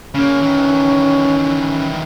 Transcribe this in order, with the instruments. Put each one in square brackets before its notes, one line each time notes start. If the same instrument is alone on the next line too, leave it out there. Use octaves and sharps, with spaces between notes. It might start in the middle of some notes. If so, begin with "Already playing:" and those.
[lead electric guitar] C#3 A#3 [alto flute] C#4
[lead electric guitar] D#3 E3